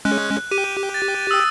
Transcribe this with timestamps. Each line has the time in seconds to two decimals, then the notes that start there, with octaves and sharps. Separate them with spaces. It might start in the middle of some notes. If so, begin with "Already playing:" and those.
0.05 G#3 C#4 F#6
0.51 G4 D#7
0.94 A6
1.31 D#6 E6